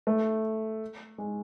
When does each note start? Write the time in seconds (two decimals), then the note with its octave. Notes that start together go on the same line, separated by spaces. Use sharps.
0.07 A3
1.18 G#3